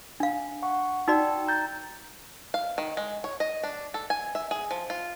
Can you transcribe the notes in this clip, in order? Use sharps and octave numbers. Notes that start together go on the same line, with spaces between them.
D4 F5
F#5 C#6
D#4 F#4 D5 G5 E6
A#5 G6 A6
F5
D#3
G#3
C#5
D#5
D4
A4
G#5
E5
G#4
F3
F4